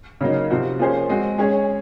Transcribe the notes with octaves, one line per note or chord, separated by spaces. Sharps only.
C#3 F#3 A#3 D#4
C3 F3 C4 F#4
F3 A#3 C#4 G#4 C5
G#3 C4 F#4
G#3 C#4 G#4 C#5